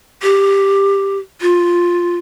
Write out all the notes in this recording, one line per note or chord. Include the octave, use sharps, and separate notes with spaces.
G4
F4